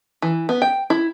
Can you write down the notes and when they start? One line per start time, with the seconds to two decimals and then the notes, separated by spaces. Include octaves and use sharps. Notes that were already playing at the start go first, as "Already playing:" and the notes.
0.22 E3
0.49 B3
0.62 G5
0.90 E4